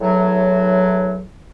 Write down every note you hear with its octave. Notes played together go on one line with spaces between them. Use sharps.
E2 A2 F#3